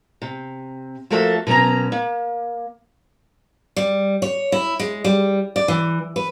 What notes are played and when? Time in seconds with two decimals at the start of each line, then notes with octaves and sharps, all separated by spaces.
0.22 C3
1.10 F3 A3 A#3 F#4 A4 E5
1.47 B2 F#3 A#3 C#4 A#5
1.92 A#3
3.76 G3
4.22 C#5
4.52 E4
4.79 G#3
5.04 G3
5.56 D5
5.68 E3
6.16 B4